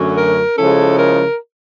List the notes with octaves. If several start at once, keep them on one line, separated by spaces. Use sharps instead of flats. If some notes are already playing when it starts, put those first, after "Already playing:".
Already playing: F#2 D3 F#3 A3 C#4
A#4
C#3 F3 G#3 C#4 E4 A4
A#4